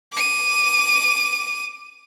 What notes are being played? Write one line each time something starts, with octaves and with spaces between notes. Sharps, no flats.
D6 D#7